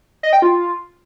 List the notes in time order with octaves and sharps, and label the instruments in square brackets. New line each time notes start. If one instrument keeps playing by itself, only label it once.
[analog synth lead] D#5
G5
F4